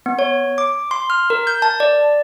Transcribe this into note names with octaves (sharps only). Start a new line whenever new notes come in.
B3
C#5
D6
C6
F6
A#4
G6
A5
D5